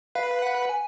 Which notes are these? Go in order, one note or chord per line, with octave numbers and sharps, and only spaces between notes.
B4 F5
F#5
G#5